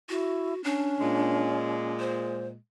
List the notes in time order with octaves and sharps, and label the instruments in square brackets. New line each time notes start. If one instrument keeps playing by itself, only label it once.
[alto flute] E4 [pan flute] F#4
[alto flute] C#4 [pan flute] D4
[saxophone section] A#2 G#3
[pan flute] C5